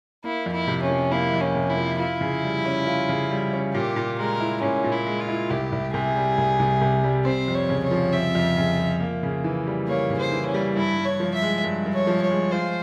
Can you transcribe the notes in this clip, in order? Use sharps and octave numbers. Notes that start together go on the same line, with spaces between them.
A#3 E4
F2
E4
C3
C#4
F3
A#3 E4
F2
C#4
C3
E4
F3
E4 F4
C#3
G3
C#4
F4
C#3
G3
C#4
A#2 G4
A#2
G#3 A#4
E4
A#2 C#4
A#2
E4
G#3
F4
E4
C2 G4
C2
C3 G#4
G3
C2
C2
C3
G3
C4 C5
F2
C#5
C#3
C#5
F3
C4 E5
F2
C#3
F3
A#3
C#3
E3
G3
A#3 C#5
C#3
C5
E3
C#4
G3
G2 E4
G2
C#5
F3
E5
G#3
G2
G2
C#5
F3
C#5
G#3
F4 C5